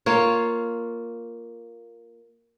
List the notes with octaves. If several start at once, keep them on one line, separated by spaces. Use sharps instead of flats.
A#3 F4 C#5